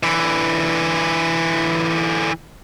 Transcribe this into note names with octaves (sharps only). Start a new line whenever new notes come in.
D3 E3